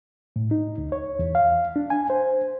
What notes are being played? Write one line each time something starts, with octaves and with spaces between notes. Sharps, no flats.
A2
D#4
D2
C#5
E2
F5
D4
G#5
C5